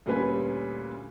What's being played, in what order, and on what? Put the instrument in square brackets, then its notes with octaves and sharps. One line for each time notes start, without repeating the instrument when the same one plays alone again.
[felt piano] D2 A#2 G3 C#4 B4 G#5